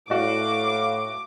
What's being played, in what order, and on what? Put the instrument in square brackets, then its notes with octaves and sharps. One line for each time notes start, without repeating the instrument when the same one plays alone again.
[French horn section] A2 [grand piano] F#4 D5 [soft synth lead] F5 [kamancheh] D6